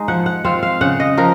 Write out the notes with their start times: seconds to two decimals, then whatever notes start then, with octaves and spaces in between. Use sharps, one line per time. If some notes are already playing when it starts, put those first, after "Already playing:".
Already playing: G#3 D#4
0.08 F3 F#5
0.26 F#5
0.45 C4 F4 F5
0.63 F5
0.81 C#3 F#5
1.00 D#5
1.17 F3 A#4